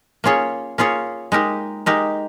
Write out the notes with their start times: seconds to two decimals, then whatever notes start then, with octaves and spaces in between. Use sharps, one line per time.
0.24 A#3 C#4 F4 G#4 C#5
0.78 A#3 C#4 F4 G#4 C#5
1.32 G#3 D#4 G4 A#4
1.86 G#3 D#4 G4 A#4